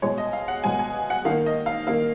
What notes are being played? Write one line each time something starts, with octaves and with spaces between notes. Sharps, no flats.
B2 G#3 C#5
D#5
F5
F#5
B2 G#3 G#5
G#5
F#5
D#3 A#3 F5
D#5
F5
D#3 A#3 F5